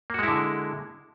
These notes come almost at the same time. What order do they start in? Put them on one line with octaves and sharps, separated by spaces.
A#3 F#4 G#3 E4 D3